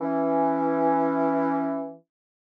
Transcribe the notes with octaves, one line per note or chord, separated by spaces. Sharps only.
E3 C#4